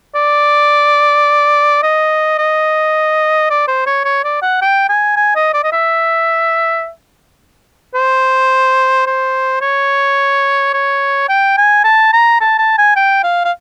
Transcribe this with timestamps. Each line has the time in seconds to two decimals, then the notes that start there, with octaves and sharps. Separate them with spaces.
0.15 D5
1.83 D#5
2.39 D#5
3.50 D5
3.68 C5
3.86 C#5
4.05 C#5
4.24 D5
4.42 F#5
4.62 G5
4.89 G#5
5.16 G#5
5.36 D#5
5.54 D5
5.64 D#5
5.72 E5
7.95 C5
9.07 C5
9.62 C#5
10.74 C#5
11.29 G5
11.57 G#5
11.84 A5
12.13 A#5
12.41 A5
12.59 A5
12.78 G#5
12.96 G5
13.24 F5
13.44 F5